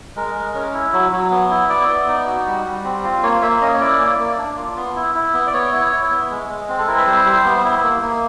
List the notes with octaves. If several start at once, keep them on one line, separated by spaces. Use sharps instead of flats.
G#3 A#4
G#3
C#4
E4
F#3
F#3
B3
E4
B3 D5
B3
D#4
F#4
G3
G3
C4
F4
A#3 C#5
A#3 E5
C#4 D#5
C#5
E4 D5
A#3
A#3
D4
F4
B3
E4
E4
B3
D5
B3 C#5
E4
E4
B3
G#3
G#3
C4
A4
E4 A#4
B4
G3 C5
G3
B3
E4
A#3
A#3